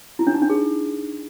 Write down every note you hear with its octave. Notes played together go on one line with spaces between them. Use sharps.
E4
D4
D#4
D4
G#4